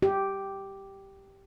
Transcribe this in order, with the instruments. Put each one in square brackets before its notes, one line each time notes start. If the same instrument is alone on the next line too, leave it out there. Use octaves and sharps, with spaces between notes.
[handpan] G4